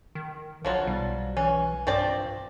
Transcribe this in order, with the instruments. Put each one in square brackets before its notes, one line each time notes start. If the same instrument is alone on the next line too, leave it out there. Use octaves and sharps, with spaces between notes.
[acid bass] D#3
[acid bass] A#1 [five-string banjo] F3 F#3 F4
[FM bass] B1 [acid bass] G3
[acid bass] E3 [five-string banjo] C#4
[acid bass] G2 [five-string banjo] F3 C4 D5